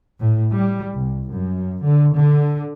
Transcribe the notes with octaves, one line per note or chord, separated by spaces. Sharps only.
A2
G3
C2
F#2
D3
D3